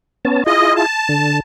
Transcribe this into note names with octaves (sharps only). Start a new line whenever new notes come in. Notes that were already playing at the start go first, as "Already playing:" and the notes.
B3 C#4 A5
E4 F4 G#4 D#5
A5
D3